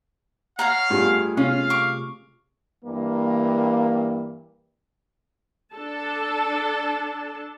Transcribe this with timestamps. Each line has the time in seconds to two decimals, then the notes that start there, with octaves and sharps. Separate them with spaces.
0.59 C#5 F5 F#5 A#5
0.90 G2 A3 F4 G#4
1.37 C3 C#4 F4 F5
1.70 C#6 D6
2.85 G2 E3 A#3
5.74 D4 A4 A5